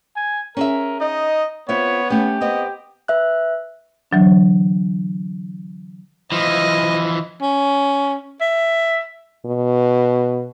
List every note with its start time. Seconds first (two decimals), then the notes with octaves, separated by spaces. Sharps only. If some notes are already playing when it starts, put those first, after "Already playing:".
0.16 G#5
0.57 C#4 G#4 A#4 E5
1.01 D#4 D#5
1.69 B3 C4 F4 C#5 E5
2.10 A3 C#4 G4
2.41 B3 C4 D#5
3.08 B4 E5 F#6
4.11 D3 E3 F#3 D4
6.32 E3 F3 D#5
7.42 C#4
8.41 E5
9.45 B2